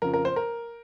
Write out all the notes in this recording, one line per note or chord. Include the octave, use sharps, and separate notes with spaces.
F2 C#3 F3 A#4
A#4
C5
A#4